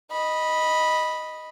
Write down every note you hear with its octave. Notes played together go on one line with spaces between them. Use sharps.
D#5 B5